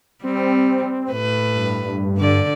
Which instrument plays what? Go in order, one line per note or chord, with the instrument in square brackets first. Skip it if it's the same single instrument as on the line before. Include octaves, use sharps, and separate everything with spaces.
[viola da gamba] G3 [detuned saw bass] C4
[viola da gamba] A2 B4
[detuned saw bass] G2
[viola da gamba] D3 D5